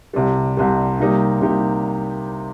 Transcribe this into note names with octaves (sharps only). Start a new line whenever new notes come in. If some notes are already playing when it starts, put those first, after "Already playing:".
C2 C3 G3
C2 C3 G3
C3 G3 A#3 D#4 G4
C3 G3 A#3 D#4 G4